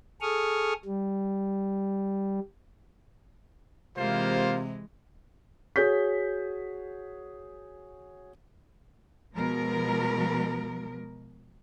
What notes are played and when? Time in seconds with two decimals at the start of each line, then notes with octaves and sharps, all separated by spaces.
0.21 G#4 A4 C#6 D#6 F6
0.85 G3
3.97 C3 E3 G#3 A#3 F4 C5
5.76 F#4 G#4 C#5 G6 B6
9.36 B2 F3 G#3 A#4